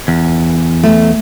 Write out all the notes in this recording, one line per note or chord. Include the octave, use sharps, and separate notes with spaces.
E2
A3